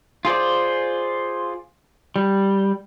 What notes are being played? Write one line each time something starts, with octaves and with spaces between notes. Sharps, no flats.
F4 G#4 C5 D5
G3